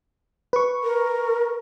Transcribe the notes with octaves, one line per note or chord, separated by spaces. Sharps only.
B4 C#6
A#4